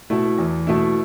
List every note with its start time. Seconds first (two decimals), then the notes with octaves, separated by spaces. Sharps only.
0.10 B2 A3 E4
0.38 E2
0.67 B2 A3 E4